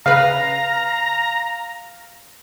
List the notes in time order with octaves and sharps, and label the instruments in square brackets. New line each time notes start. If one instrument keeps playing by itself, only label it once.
[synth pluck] C#3 B4 [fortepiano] F5 [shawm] A#5